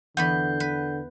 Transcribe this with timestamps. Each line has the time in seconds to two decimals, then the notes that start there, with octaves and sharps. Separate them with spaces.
0.17 E2 D3 B3 F#5 B5 G6
0.60 B4